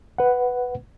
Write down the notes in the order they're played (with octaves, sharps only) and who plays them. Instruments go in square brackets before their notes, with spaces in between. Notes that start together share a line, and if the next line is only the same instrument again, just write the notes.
[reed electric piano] B4 F#5